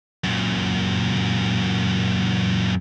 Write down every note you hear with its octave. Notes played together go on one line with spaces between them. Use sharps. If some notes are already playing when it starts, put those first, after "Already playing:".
F#2 A#2